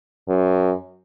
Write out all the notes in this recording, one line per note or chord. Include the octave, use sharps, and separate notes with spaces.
F#2